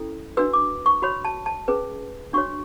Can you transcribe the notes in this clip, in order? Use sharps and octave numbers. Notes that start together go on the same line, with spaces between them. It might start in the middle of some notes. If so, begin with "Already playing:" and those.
Already playing: C#4 E4 A4
D4 F#4 B4 E6
D6
C#6
F#4 C#5 B5
A5
A5
C#4 G#4 B4
D4 F#4 C#5 C#6